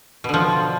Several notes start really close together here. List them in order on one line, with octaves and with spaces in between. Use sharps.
B2 D3 F3